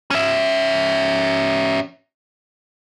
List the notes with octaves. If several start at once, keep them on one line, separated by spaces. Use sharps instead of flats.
C#4 E5